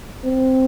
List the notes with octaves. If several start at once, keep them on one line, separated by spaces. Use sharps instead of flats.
C4